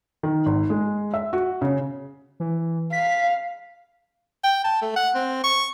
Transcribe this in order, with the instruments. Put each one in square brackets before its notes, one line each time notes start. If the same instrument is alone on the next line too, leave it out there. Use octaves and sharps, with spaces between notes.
[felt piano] D#3
G#1
G#3
E5
F#4
C#3
[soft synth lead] E3
[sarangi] F5 [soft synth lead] B6
[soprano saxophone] G5
A5
A3
F#5
C4
C#6